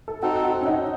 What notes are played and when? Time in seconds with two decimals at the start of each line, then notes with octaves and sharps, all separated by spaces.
0.08 A4
0.22 C4 D#4 F#4 A4
0.44 F#4
0.62 C#4
0.67 D#4